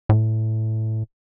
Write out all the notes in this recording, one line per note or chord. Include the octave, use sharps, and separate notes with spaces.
A2